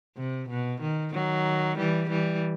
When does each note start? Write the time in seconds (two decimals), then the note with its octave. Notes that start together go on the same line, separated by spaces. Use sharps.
0.17 C3
0.49 B2
0.81 D#3
1.13 D#3 F#3
1.78 E3 G3
2.10 E3 G3